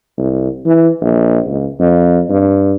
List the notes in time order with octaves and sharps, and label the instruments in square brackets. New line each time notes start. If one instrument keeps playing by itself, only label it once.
[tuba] C2
E3
A#1
C#2
F2
G2